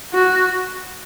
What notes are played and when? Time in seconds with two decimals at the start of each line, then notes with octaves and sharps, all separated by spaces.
0.14 F#4